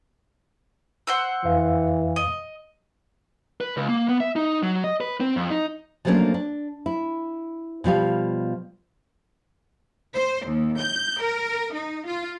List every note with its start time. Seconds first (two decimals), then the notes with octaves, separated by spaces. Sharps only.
1.07 C5 F#5 E6
1.45 F2 E3 F5
2.16 D#5
3.61 B4
3.77 C#2
3.88 A#3
4.09 B3
4.20 E5
4.36 D#4
4.63 F#3
4.84 D#5
5.01 B4
5.20 C4
5.36 F2
5.50 D#4
6.05 F3 F#3 A3 A#3 C#4 D4
6.34 D4
6.86 E4
7.84 B2 F3 G3 F5
10.14 C5
10.47 D#2
10.80 G6
11.22 A#4
11.75 D#4
12.07 F4